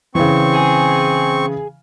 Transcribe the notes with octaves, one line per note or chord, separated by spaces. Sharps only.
C#3 E3 C4 C#6
G#4 G#5